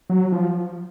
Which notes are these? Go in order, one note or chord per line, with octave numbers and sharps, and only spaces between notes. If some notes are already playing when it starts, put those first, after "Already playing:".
F#3
F3